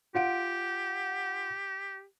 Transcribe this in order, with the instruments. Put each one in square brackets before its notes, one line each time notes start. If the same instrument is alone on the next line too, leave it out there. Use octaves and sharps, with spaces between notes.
[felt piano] F4 F#5 D7 [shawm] G4